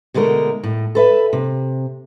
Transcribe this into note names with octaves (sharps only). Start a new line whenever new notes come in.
B2 D3 G#3 A3 A#4
A2
A4 B4 E5
C3